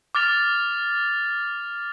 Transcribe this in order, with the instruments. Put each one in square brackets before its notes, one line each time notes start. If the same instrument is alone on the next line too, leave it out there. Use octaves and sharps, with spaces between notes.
[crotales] D6 F6 A6 F7